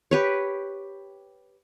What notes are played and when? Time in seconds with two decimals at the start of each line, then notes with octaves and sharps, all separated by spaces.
0.11 G4 B4 C#5